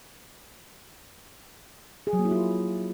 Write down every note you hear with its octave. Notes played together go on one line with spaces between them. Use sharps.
G#4
F#3
A#3
E4
F4